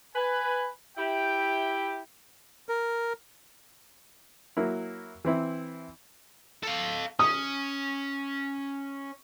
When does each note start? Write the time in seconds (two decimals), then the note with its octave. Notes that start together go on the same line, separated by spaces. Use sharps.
0.15 B4 G#5
0.98 E4 G4 G5
2.69 A#4
4.57 F#3 A#3 E4
5.25 E3 C4 E4
6.63 A4 F5
7.19 C#4 D#6